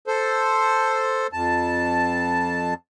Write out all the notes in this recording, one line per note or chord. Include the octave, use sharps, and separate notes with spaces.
A4 C5
F2 A5